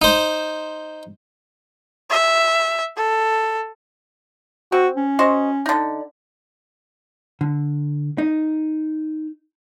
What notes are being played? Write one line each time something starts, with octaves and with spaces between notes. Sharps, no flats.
D#4 C5
E5
A4
C4 F#4
C#4
F#4 C5 D#5
D3 D#4
D3
D#4